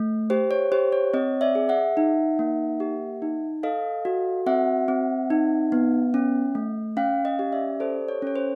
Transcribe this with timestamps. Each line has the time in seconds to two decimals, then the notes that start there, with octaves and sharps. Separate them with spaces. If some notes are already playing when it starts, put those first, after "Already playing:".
Already playing: A3
0.30 G4 C5
0.51 C#5
0.72 G4 C5
0.92 C#5
1.13 C4 C#5 D#5
1.41 D5 E5
1.55 G#4
1.69 E5 F#5
1.97 D#4
2.39 A#3
2.80 G4
3.22 D#4
3.63 A4 D#5 F5
4.05 F#4
4.47 C4 E5 F#5
4.88 C4
5.30 D#4
5.72 B3
6.14 C#4
6.55 A3
6.96 C#4 F5 G5
7.25 D#5 F5
7.39 G4
7.52 D5 E5
7.80 A4 C5 D5
8.08 C#5
8.22 C#4 C#5
8.36 C5